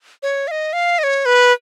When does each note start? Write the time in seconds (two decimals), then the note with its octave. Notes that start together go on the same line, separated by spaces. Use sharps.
0.23 C#5
0.48 F5
0.51 D#5
0.73 F5
0.99 D#5
1.04 C#5
1.26 B4